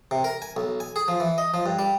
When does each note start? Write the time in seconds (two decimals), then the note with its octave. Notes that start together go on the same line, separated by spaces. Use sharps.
0.11 C3
0.24 A#4
0.42 G#5
0.57 B1
0.80 G#5
0.96 G#4
1.08 F3
1.20 E3
1.38 D#5
1.54 F3
1.66 G2
1.79 G3